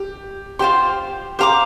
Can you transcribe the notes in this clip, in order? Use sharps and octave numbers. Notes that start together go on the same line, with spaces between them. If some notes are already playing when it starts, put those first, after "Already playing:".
Already playing: G4
F4 G4 C5 G5 C6
G4 C5 F5 A#5 D6